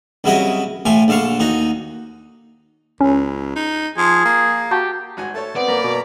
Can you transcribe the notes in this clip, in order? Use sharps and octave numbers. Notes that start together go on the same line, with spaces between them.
C2 C#3 F#3 E4 F#4 D#5
A2 A3 F4 G#5
A#1 D3 A4 F5 C#6
D#2 D#4 F#4
C#2 C#4
D#4
F3 G#4
A#3
F#4 G4 A5
G#1 F#4 G#5
A3 A4 C#5 A5
B3 C4 D5
F#2 A#3 A#5 B5
B2